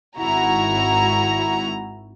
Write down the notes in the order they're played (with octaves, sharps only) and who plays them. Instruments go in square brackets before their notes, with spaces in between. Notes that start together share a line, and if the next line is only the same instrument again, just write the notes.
[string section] G#1 E4 F#4 A#5